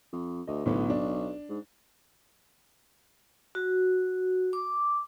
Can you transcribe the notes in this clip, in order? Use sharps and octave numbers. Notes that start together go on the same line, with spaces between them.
F2
D2 D#5
B1 A2 D3 B3
D4
G#2
F#4
D6